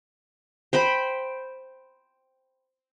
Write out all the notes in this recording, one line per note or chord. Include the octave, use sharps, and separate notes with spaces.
C5 G5 B5